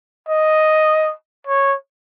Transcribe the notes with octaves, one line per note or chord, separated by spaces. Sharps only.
D#5
C#5